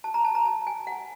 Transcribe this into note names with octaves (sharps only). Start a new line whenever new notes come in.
A5
A#5
A5
A#5
A5
G#5
F#5